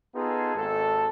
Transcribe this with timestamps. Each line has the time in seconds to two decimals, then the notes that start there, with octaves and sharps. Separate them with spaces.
0.15 B3 D#4 F4 G#4 A4
0.55 G#1 D#2 G#2 A4